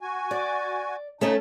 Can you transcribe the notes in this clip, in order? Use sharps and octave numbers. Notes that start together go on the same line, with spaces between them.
F#4 G#5
D5
C#3 A3 C#4 D#4 A4 D#6